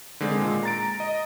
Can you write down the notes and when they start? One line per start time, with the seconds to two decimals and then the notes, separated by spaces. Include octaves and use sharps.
0.20 D3 D#3 G#3 C4
0.37 A#2 G#3
0.63 A#5 A6 D7
1.00 D#5